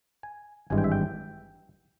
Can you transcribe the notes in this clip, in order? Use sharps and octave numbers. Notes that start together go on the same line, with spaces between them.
G#5
G#1 G2 E3 G#3 G#5
G5
E5
G5